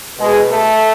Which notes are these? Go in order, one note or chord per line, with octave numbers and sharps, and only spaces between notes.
B2 G#3 G#4
A3 A4